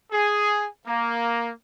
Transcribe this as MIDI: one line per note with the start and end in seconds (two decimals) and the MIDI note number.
0.12 0.67 68
0.87 1.49 58